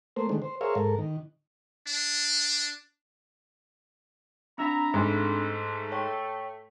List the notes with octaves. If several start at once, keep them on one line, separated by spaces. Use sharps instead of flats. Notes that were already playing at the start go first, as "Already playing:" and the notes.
A3 A#3 C5
D3 D#3 G#3 A3
C5
G#4 A#4 C5 C#5 E5 F5
G#2 A4 A#4
D#3
D4
C4 D4 E5 A#5 B5
G#2 A3 A4
C#5 G5 C#6